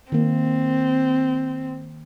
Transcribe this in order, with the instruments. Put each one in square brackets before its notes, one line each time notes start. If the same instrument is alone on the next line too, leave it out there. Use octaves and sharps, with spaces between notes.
[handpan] D#3 A#3 [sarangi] C4